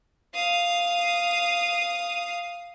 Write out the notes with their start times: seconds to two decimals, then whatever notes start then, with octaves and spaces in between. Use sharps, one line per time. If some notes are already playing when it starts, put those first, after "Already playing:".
0.34 F5 D#6